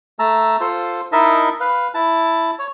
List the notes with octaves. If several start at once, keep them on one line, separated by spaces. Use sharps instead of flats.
A3 A5 A#5 E6
F4 A4 C5
D#4 E4 A#4 D#5 E5 A5
B4 F5
E4 A5
C#5